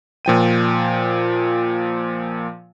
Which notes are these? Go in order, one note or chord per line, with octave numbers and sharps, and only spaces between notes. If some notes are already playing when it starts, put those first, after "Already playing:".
A#2 F3 G5 D#7